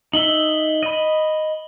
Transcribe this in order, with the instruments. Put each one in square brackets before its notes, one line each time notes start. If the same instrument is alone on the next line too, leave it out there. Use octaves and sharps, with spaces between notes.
[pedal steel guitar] D#4 E5 [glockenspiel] F#7 G7
[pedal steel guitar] D#5 B5